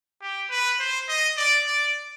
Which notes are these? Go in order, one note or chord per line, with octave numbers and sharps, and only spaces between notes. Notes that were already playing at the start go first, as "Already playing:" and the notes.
G4
B4
C5
D#5
D5
D5